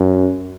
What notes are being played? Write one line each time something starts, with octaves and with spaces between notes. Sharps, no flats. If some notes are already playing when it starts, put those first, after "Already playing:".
Already playing: F#2